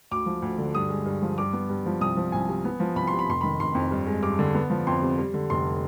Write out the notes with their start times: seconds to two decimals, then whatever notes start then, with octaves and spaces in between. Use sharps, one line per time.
0.11 D2 D6
0.26 F3
0.42 D2
0.58 D3
0.75 G2 D#6
0.90 G#3
1.05 G2
1.22 F3
1.38 G2 D6
1.53 B3
1.70 G2
1.86 F3
2.01 C2 D#6
2.17 F3
2.32 C2 G#5
2.49 C3
2.65 B3
2.80 F3
2.96 C2 B5
3.07 C6
3.13 C3
3.19 B5
3.28 F1 C6
3.41 D#3 B5
3.60 F1 C6
3.75 F2
3.91 G2
4.07 G#3
4.22 G2 D6
4.39 D3
4.55 B3
4.70 F3
4.87 F2 C6
5.02 C3
5.18 G3
5.34 D3
5.50 F1 C6